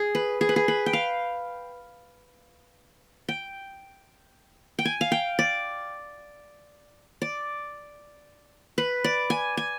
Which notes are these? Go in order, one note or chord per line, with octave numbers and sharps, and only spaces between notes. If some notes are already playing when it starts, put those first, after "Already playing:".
Already playing: G#4
B4
G#4
B4
G#4
B4
G5
F5
G5
G5
G#5
F5
G5
D5
D5
B4
D5
G#5
G#5